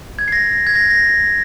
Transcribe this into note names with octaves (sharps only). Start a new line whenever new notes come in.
G#6
C7
A#6
G#6
A#6
A#6